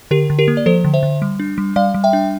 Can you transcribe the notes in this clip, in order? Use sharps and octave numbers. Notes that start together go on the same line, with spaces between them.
D3 G4 A#4
D3
G4 A#4
A#3
D5
F3 A4 C5
D3
C5 E5
D3
G3
D4
G3
G3 D5 F5
G3
E5 G5
D4